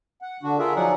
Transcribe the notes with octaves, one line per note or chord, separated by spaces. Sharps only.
F#5
D3 D4 F#4
F4 G#4 A#4 E5
F3 F#3 D#4 G#4 D5 F#5